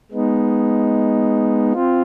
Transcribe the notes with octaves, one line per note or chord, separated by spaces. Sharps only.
G#3 B3 D#4
C4 F4